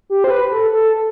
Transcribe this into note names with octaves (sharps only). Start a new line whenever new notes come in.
G4
C5
B4
A4
A4